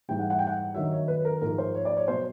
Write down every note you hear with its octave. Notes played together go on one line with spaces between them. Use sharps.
G#2 E3 G3 G5
F#5
F#5
G5
F#5
G2 D#3 F#3 E5
C#5
B4
A#4
G#2 F3 A#4
C5
C#5
D5
C#5
B2 F#3 C5